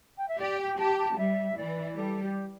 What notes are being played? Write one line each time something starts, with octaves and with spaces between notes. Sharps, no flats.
G5
E5
G4 D5
G5
G4 A5
A5
G3 E5
E3 D5
G3 A4
G4